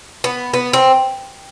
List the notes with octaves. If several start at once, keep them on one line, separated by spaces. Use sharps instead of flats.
B3
B3
C4